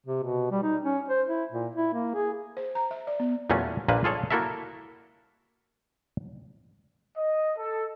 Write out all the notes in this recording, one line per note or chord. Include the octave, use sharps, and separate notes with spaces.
C3
B2
G3
D#4
C#4
C5
E4
A#2
E4
A#3
G#4
C5
A#5
E5
D5
B3
E2 A#2 F#3 A3 C#4
A#1 A#2 A#3 B4
F4 G#4 A4 C#5
A#3 E4 F#4 A4 A#4 E5
D#5
A4